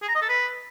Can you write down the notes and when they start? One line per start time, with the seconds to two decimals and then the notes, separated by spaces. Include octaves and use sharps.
0.02 G#4
0.09 A#5
0.15 D#5
0.22 A4
0.29 B4